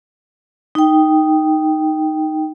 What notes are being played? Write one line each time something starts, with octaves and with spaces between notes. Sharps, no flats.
D#4 G5